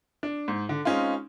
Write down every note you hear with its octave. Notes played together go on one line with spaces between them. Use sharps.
D4
G#2
D3
G#3 C4 C#4 D#4 F4